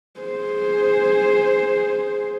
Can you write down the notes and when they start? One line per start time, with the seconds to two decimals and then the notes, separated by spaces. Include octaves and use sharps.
0.20 G#4 C5